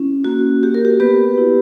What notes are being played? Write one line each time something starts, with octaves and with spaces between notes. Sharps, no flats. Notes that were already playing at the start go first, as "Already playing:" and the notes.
Already playing: C#4 E4
A#3 F#4
F#4 G4
A#4
G4
B3 G4 B4
E4